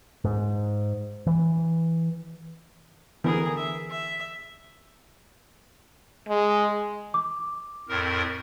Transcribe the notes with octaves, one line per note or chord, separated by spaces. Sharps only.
G#2
E3
D3 E3 B3 G#4 A#4
E5
E5
G#3
D6
F2 A2 A#4